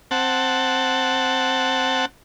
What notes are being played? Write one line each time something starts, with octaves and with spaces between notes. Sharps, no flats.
C4 F#5 A5